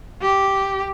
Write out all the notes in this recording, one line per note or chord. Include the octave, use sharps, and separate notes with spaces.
G4